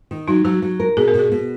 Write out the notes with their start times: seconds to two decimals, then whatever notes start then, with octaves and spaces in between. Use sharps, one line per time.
0.11 D#3
0.28 F#3 D#4
0.45 F#3 F#4
0.62 F#3
0.80 A#4
0.97 B2 G#4
1.08 A#4
1.14 B2 G#4
1.32 B2